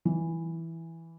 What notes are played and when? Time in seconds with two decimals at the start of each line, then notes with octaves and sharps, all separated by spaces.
0.05 E3